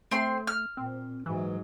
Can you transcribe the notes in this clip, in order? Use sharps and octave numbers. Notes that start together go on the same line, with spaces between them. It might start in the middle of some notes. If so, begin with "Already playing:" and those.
A3 C4 C6
F6
A#2 C4
G#2 E3 F#3